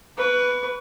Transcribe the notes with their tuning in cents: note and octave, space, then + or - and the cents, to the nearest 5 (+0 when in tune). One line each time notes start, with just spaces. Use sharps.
B4 +0 C#6 +30